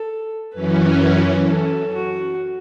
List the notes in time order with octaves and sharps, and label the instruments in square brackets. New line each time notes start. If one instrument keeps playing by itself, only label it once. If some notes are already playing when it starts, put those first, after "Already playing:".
Already playing: [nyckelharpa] A4
[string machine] F#2 E3 C#4 [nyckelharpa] B4
[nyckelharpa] A4
F#4